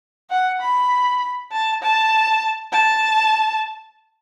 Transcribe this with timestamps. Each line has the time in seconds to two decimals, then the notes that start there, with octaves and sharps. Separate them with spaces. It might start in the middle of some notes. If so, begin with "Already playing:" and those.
0.30 F#5
0.61 B5
1.52 A5
1.82 A5
2.72 A5